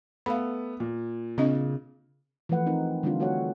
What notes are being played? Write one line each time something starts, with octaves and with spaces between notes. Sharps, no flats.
A3 B3 F5 B5
A#2
C#3 C4 D4 D#5
E3 F3 A3 B4 F#5
C4 D#4 A#4
D3 G3 A3 C4 D4 F4
A3 F#4 A4 C#5 F#5